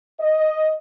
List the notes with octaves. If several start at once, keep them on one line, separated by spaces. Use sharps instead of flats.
D#5